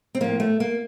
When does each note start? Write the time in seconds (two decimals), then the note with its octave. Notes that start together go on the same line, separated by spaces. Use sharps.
0.15 C4
0.21 A2 F3 A#3
0.40 A3
0.60 A#3